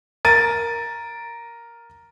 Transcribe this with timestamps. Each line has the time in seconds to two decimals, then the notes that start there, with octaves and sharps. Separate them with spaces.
0.25 A#4 A6 D#7